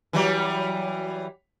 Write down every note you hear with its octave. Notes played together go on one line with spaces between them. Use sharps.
E3 F#3 G3